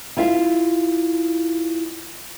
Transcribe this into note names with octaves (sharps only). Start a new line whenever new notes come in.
E4 F4 E5 F5